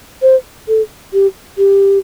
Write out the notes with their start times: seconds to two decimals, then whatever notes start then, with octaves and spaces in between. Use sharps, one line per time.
0.22 C5
0.68 A4
1.13 G4
1.58 G4